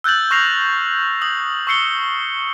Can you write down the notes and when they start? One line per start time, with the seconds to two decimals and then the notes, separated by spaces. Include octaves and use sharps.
0.04 E6 F#6 G6 A6 F#7
0.31 C#6 F6 A#6 C7 F7
1.22 D#6 F#7
1.67 C#6 E6 C7 C#7 G7